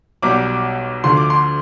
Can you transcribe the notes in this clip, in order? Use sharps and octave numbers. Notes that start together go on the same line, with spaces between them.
B1 B2 G3 D6
D2 D3 F3 C6
D6
C6